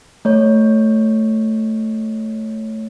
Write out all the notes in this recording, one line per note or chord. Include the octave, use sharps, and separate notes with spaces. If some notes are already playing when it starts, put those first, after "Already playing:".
A3 C#5